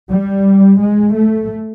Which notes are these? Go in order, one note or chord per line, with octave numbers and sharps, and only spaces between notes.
G3
G#3
A3